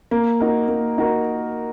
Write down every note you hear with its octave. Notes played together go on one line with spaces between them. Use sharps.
A#3
D#4 F#4 A#4
A#3
D#4 F#4 A#4